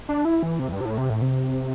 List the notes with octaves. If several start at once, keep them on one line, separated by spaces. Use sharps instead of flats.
D4
E4
E3
C3
E2
G2
C3
A2
C3
A2
C3